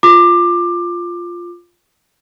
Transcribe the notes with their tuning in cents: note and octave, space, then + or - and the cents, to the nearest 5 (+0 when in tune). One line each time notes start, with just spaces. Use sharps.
F4 +0 D6 +20